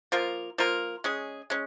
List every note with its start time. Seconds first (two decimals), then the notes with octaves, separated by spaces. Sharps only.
0.12 F3 A#3 F4 A#4
0.58 F3 A#3 F4 A#4
1.04 G#3 C#4 G#4
1.50 G#3 C#4